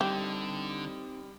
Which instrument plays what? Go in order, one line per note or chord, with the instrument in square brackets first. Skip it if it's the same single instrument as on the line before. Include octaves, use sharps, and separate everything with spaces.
[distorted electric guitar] D3 [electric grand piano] G3 [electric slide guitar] C4 D#4 [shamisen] G4